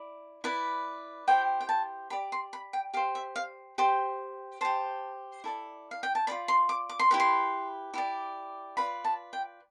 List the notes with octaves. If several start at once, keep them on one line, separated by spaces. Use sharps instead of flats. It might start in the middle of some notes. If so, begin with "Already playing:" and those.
Already playing: E4 D5
E4 B4 D5
E4 G4 C5 G5
G5
A5
G4 D5 B5
C6
B5
G5
G4 C5 F5
E5
F5
G4 C5
G4 C5 A5
E4 A4 D5
F5
G5
A5
F4 A4 D5 B5
C6
D6
D6
C6
E4 G4 B4 B5
C6
E4 G4 D5
F4 B4 D5 B5
A5
G5